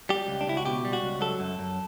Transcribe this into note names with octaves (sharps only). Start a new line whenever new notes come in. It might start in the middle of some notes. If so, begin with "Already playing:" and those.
G3 G4
C#2
D4
C#2 E4
F#4
B2 G4
G3
F#4
C#2
F#3 A4
F#2
F#2